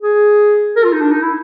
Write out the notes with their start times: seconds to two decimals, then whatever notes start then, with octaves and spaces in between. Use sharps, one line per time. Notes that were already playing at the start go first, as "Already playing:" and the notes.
0.02 G#4
0.76 A#4
0.84 F4
0.93 D#4
1.01 D4
1.11 D#4
1.22 E4